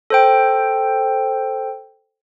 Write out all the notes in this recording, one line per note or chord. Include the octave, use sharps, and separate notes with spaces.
A4 C5 G5